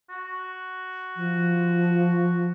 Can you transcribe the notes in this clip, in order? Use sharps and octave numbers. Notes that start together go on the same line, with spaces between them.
F#4
F3